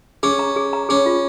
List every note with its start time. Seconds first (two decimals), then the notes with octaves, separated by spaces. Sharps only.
0.23 C#4 G#4
0.39 A#5
0.56 G#4
0.73 A#5
0.89 C#4 G#4
1.06 F4